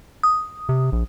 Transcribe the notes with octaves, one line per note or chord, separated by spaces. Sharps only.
D#6
C3
A#1